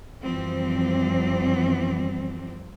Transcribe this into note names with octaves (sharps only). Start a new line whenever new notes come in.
F#2 E3 F3 G3 C4